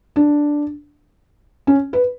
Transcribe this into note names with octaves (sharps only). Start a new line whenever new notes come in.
D4
C#4
B4